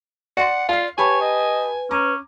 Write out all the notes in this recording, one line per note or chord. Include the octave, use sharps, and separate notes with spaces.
D5 F#5 C6
F4 D5 F5 C7
G4 B4 C#5 G#5 A5 B5
D#5
C#4 A#5 D6